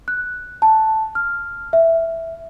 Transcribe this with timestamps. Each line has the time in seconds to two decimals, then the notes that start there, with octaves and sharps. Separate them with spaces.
0.08 F#6
0.62 A5
1.15 F6
1.73 E5